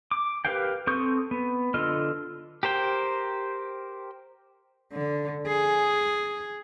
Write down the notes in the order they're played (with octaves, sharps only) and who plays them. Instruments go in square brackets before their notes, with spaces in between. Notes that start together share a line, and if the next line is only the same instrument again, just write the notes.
[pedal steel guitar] D6
G4 A#4 B4 F5 G5
C4 A4 C#6 D#6 G6
B3
D3 F4 A4 D#5 F6
G4 A#4 C5 G5
[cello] D3
G#4